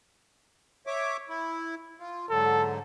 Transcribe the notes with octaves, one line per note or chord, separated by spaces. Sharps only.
C#5 E5 D6
E4
F4
G#2 D3 F#3 A4